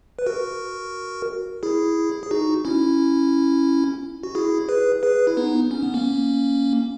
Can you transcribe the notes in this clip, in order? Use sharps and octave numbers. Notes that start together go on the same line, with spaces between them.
B4
F#4 A#4
E4 G#4
G#4
D#4 F#4
C#4 E4
F#4
E4 G#4
G#4 B4
G#4 B4
E4
B3 D#4
C#4
B3
A#3 C#4